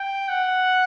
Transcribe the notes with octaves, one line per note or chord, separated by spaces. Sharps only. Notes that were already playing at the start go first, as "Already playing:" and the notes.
Already playing: G5
F#5